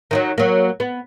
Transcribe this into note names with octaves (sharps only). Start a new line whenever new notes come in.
D#3 F3 F#3
F#3 A#3
B3